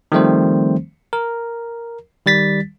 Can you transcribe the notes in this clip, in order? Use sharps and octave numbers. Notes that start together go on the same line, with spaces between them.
D#3 F3 G3 A3 C4 C5
A#4
D#3 G3 A6 B6